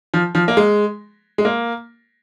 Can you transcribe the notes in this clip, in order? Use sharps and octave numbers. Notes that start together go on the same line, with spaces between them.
F3
F3
A#3
G#3
G#3
A#3